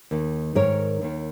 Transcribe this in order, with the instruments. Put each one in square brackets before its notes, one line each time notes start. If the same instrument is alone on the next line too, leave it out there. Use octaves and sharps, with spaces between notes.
[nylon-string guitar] D#2 D#3
G#2 D#3 A#4 C#5
D#2 D#3